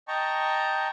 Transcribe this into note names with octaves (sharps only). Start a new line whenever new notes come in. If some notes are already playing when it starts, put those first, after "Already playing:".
D#5 G5 A5 A#5 C#6